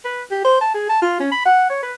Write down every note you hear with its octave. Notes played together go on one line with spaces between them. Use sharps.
B4
G4
C5
A5
G#4
A5
F4
C#4
B5
F#5
C#5
B4